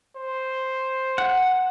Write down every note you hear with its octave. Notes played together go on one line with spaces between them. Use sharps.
C5
F#5